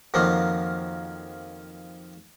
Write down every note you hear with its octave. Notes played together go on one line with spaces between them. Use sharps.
F2 D#3 F3 F#3 A#3